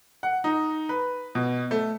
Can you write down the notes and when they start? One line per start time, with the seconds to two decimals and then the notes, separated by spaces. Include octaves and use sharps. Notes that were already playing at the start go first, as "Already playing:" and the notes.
0.23 F#5
0.44 D#4
0.89 B4
1.35 B2
1.71 A3